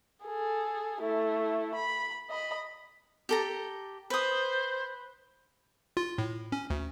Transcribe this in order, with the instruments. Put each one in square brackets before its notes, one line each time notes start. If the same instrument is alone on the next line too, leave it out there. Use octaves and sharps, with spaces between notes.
[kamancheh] G#4 A4
A3 E4
B5
D#5 B5
[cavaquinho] G4 A4 A#5
[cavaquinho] B4 D#6 [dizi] C5
[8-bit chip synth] F4
A2
C#4
D2